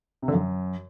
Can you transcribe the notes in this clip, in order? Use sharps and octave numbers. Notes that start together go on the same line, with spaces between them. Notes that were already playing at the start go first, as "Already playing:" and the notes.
C3
D3
F#2